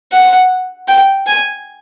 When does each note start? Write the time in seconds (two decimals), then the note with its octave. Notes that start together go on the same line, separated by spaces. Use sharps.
0.12 F#5
0.88 G5
1.27 G#5